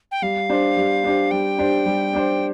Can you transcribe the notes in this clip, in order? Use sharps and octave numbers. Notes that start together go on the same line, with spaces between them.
G5
G3 F5
D4 G4 C5
G3
D4 G4 C5
G3 G5
D4 G4 C5
G3
D4 G4 C5